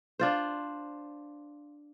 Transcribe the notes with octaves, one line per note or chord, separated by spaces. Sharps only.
D4 F4 C5